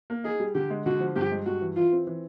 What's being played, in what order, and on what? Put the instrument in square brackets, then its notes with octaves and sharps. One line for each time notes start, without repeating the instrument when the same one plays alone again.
[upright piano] A#3
[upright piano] D#4 [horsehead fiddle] G#4
[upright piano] G3
[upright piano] D3 [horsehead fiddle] G4
[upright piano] G#3
[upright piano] D3 [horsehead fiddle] F#4
[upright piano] F3
[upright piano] G2 [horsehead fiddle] G4
[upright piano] G#3
[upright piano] G2 [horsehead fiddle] F#4
[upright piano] E3
[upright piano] E3 [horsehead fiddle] F4
[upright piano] C4
E3